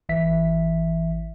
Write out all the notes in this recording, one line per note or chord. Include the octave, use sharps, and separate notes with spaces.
G#1 E3 E5 B6